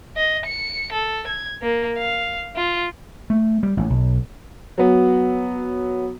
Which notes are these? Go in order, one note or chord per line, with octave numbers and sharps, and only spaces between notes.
D#5
C#7
A4
G#6
A#3
F5
F4
A3
G3
A1
B1
F#3 B3